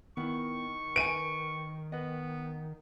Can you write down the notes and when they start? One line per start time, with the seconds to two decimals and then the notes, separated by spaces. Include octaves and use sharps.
0.17 D#3 B3 E4 C#6
0.96 B4 G#5 D7 D#7
1.92 B3 B4 D#5